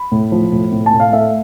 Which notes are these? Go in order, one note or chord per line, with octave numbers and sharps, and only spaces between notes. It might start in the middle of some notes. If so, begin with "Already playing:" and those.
Already playing: B5
A2
F3
A2
A2
A5
A2
F5
A3 E5